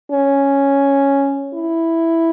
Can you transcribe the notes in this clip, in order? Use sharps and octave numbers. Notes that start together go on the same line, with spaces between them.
C#4
E4